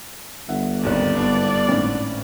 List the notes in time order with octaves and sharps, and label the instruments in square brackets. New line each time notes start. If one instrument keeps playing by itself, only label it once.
[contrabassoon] G1 [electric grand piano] E5 F#5
[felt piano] G#1 G#2 [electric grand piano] D#2 D#3 F#6 [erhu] D5
[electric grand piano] G2 B3 D4
[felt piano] G#1 A2 C#4